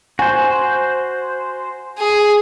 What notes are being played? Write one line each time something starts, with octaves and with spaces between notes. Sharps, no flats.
F#4 C5 G#5
G#4